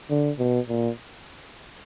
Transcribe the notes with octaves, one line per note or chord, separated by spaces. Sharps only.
D3
B2
A#2